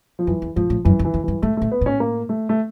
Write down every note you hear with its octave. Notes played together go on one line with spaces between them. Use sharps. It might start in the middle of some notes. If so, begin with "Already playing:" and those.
F3
F#2 E3
E2
G#2 F3
A2
F#2 E3
F2
E3
F2
G2 E3
G#2 A3
A2 A3
B3
A2 C#4
A#3
A3
A3